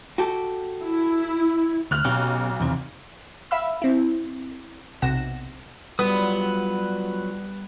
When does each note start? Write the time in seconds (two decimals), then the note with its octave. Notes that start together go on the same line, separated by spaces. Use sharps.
0.18 F#4 G4 A4
0.83 E4
1.91 D2 F6 F#6 F7
2.05 B1 B2 C#4 G4
2.60 E2 C3 D#3
3.51 E5 F5 B5 E6
3.82 C4 E4
5.02 B1 C3 F#5 A#6 E7
5.99 F#3 G3 B3 F4 B4 D#6